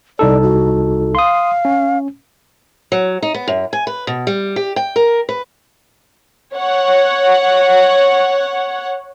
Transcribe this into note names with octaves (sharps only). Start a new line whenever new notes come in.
C2 D#4 A4 D5
F#4
F5 C6 D#6
C#4
F#3
D#4
B3
F#2
G#5
B4
B2
G3
G4
G5
A#4
B4
C#5 F#5